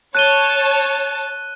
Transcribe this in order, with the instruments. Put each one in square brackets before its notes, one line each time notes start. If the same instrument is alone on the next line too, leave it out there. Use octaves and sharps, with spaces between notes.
[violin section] C#5 A5 [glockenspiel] F#6 D#7 G7